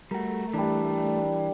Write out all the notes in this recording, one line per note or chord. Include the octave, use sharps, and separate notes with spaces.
G3 A3 F#4 A#4
E3 G3 D4